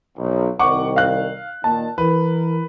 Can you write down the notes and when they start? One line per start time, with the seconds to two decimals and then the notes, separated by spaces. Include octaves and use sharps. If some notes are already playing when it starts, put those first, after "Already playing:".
0.18 B1
0.59 C2 D#3 F#5 C#6 D6
0.96 F5 F#6
1.64 A#2 D#3 A5
1.98 E3 A#4 B4